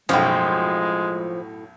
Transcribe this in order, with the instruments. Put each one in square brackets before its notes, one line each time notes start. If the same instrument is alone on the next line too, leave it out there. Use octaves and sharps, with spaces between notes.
[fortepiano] B1 F#2 [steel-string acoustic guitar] A2 F#3 G5 [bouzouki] F3 [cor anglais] G#3